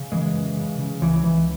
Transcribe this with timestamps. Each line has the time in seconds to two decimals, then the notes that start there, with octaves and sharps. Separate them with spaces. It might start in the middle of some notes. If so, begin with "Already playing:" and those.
Already playing: C#3
0.12 F#2 E3 G#3
0.35 F#2
0.57 C#3
0.79 C#3
1.01 C#2 E3
1.23 C#2 E3